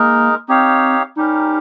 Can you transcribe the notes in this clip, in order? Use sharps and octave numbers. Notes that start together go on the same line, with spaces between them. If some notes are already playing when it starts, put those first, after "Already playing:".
Already playing: G#3 A#3 D#4 A#4
C4 D#4 G4 C#5 F5
G3 C#4 D#4 G4 A#4